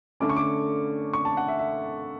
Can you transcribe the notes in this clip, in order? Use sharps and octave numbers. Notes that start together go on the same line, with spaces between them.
D3 A3 C#4 D6
C#6
D6
C#6
A5
F#5
E5
E5